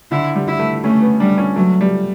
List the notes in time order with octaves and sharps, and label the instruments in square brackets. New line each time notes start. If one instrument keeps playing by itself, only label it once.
[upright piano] D3 [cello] E4
[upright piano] G3
[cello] E4
[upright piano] A3
[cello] A3 [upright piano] C#4
[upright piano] B3
[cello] G3 [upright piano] D4
[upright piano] C#4
[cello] F#3 [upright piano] A3
[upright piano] G3